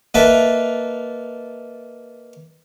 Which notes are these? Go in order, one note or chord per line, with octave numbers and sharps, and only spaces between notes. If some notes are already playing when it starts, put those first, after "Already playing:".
A#3 D#4 A4 B4 E5